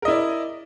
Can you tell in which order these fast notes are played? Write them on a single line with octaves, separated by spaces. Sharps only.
A#4 D#5 E4 D5